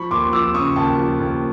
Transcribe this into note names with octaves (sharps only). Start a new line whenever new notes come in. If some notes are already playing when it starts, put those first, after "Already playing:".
Already playing: F3 B5 C#6
D#2 C6 D6
F3 D6 E6
C#3 C#6 D#6
D#2 G5 A5
F3
D#2